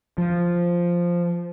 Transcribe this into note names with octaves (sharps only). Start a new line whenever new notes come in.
F3